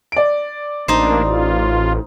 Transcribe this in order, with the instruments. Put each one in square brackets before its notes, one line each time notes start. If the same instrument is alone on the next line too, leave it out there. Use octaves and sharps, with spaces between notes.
[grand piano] D5 D7
[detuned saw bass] A1 [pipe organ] A#3 D4 [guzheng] D#4 C5
[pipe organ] F4